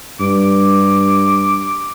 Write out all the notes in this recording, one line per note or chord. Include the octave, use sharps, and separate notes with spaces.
G2 D6